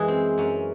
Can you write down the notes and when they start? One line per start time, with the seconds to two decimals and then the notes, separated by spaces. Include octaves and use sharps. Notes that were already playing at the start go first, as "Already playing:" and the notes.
Already playing: F#2 E3 G#3 G#4
0.08 C4
0.38 F#2 C#4